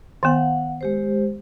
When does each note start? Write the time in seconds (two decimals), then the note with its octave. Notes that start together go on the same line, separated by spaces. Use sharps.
0.23 D#3 B3 F5 F#5
0.81 G#3 G4 C5